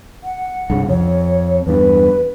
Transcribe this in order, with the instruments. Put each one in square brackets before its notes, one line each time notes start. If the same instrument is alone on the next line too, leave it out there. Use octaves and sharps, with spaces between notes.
[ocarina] F#5
[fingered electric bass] C2 G2 C#3
[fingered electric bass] F2 [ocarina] C#5
[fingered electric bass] E2 G2 [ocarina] B4